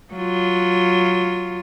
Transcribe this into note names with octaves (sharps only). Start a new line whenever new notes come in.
F#3 F4